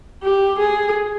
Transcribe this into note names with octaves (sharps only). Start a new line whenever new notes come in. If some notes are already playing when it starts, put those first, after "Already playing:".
G4
G#4